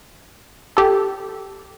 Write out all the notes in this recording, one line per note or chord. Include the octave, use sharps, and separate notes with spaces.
G4 A4